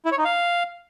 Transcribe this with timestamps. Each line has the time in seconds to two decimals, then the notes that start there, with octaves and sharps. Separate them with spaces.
0.05 E4
0.12 C#5
0.18 D#4
0.25 F5